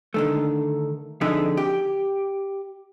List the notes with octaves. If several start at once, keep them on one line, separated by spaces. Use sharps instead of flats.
D3 D#3 A3
F2 D3 D#4 G#4 E5
G4